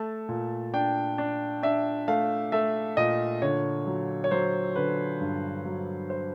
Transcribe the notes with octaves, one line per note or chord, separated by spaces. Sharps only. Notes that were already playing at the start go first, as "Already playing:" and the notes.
Already playing: A3 A5
A#2
D4 G5
D4
D4 E5
A3 F5
A3 E5
A#2 D#5
D3 C#5
F#3
C#5
F#3 C5
D3 B4
G2
F#3
C5